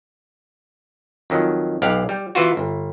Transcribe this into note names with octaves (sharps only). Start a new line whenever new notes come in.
F2 D#3 F#3
B1 G4 F5 F#5
G3
E3 B3 F4 F#4
G1